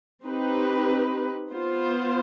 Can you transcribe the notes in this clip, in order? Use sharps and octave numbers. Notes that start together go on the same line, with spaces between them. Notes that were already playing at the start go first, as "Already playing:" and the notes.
C4 D#4 G4 B4
B3 F4 C5